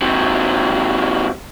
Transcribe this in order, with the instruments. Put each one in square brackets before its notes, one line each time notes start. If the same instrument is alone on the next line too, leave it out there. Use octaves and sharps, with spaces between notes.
[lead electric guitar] C3 F#3